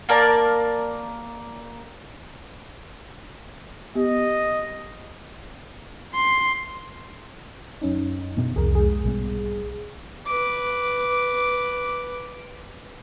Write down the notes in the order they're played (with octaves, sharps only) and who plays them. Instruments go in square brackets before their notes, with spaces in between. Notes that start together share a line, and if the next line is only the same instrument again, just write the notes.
[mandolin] A#3 A#4 D5 A5
[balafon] B3 G4 [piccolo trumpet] D#5
[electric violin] C6
[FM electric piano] F#2 C#4 D#4
[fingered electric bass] B2 B3 D4
[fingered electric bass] C2 F2 [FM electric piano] G#4 A#4
[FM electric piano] G#2 G#4
[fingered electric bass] B1 G3 B3
[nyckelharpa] B4 D6